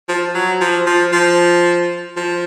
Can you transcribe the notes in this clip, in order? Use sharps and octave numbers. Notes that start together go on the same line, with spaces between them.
F3
F#3
F3
F3
F3
F3